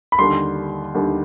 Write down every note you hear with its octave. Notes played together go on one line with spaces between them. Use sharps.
B5
D#2 D3 G3 C6
D#2 D3 G3